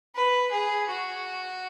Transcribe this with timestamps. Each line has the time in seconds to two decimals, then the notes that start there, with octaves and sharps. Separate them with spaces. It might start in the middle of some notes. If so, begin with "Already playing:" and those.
0.15 B4
0.52 G#4
0.88 F#4